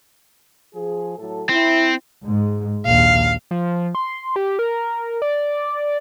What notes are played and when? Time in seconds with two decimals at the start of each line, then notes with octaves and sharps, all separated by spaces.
0.75 F3 G#4
1.17 A2 F#3 A4
1.49 C4 E4
2.24 G#2 G#3
2.86 A#1 D#2 F5
3.51 F3
3.95 C6
4.36 G4
4.59 A#4
5.22 D5